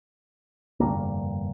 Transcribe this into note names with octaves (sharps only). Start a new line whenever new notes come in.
F1 G2 D3 A#3